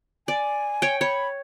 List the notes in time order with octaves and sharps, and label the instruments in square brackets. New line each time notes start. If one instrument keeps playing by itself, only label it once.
[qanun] D5 [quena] G#5
[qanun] C#5 G5
[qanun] C#5 [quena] B5